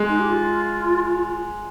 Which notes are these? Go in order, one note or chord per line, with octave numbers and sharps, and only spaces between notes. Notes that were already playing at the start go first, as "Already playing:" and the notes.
Already playing: G#3
D#4
G4
F4